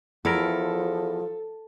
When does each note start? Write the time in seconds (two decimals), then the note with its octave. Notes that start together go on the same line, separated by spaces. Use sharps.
0.25 E2 F3 E4 A4 A#4